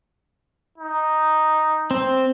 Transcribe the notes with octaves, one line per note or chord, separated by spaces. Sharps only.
D#4
C4